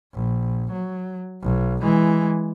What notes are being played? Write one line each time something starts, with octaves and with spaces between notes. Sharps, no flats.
A#1
F#3
B1
E3 G#3